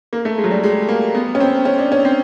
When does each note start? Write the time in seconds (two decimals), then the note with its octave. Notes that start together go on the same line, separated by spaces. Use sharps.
0.13 A#3
0.25 A3
0.38 G#3
0.44 F#3
0.51 G3
0.63 G#3
0.89 A#3
1.15 B3
1.35 C#4
1.40 C4
1.65 C#4
1.79 D4
1.92 C#4
2.05 C4